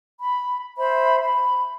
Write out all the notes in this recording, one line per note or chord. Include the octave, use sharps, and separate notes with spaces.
B5
C5 E5 B5
B5